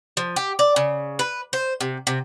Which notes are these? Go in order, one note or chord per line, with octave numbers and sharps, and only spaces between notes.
F3
G4
D5
C#3
B4
C5
C3
C3